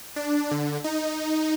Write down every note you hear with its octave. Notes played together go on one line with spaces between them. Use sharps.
D4
D3
D#4